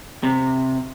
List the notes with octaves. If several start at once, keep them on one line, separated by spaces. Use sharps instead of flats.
C3